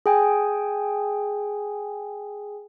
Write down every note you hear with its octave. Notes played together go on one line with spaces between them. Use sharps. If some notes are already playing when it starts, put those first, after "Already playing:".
G#4 G5 G#5